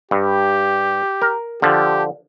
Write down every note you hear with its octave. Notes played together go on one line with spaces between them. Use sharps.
G2 G4
A#4
D3 F3 G4